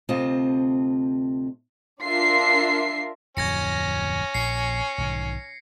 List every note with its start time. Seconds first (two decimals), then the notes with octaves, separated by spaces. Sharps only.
0.09 D2 C3 C4 F4 D#5 A5
2.03 D4 F4 A#4 E5 C7
3.37 D1 F2 C#4 G#6 A#6 C#7
4.34 A#1 C7 C#7
4.98 B1 G#2 D#3